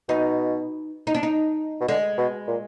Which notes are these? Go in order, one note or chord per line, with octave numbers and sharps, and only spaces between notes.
B2 D#4
D#4
D4
D#4
B2
D3 G#3
B2
A#2